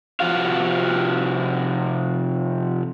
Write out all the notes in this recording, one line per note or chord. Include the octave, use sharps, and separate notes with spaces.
C3 F3 F#4 F5